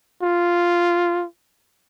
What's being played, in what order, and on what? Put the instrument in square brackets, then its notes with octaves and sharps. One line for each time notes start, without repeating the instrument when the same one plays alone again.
[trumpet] F4